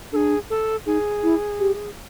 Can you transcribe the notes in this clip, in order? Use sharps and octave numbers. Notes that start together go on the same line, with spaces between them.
D4 G#4 A4
A4
D#4 G#4
E4
G4